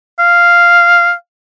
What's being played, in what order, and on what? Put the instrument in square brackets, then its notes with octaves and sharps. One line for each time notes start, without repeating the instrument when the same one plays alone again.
[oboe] F5